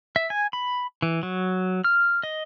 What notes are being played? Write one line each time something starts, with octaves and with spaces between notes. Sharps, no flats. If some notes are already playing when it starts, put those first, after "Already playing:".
E5
G#5
B5
E3
F#3
F6
D#5